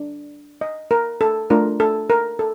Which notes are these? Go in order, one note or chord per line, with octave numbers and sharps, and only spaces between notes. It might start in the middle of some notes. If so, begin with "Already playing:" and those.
Already playing: D4
D#5
A#4
A4
A3 D4 F4 A#4
A4
A#4
A4